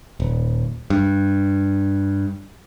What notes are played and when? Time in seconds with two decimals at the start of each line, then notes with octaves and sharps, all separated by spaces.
0.20 D#1
0.90 G2